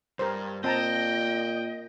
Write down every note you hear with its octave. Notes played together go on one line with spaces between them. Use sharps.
G2 A#4 C5
A#2 C4 D#5 G5 A5 A#5